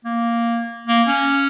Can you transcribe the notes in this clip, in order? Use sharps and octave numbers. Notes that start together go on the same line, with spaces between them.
A#3
A#3
C#4